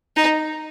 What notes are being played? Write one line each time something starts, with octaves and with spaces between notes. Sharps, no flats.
D#4